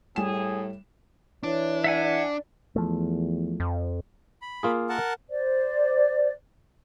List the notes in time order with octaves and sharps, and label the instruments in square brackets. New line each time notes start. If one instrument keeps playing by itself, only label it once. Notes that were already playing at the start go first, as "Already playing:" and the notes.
[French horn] A2 [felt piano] G3 E7 [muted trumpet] G#4
[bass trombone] E3 [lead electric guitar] D4 [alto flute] C#5
[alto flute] D5 [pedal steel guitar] E5 F#5 G#5
[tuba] E2 [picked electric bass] F3 A3
[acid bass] F2
[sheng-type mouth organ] B5
[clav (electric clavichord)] A#3 F4 G#4
[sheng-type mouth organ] A#4 F#5 A5
[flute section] C5 D5